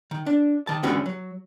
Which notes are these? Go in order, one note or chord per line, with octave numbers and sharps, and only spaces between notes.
D#3
D4
D#3 A5
D3 E3 G#3 C#4 F#4 G#4
F#3